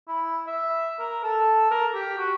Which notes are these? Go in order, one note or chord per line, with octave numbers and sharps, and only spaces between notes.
E4
E5
A#4
A4
A#4
G4
F#4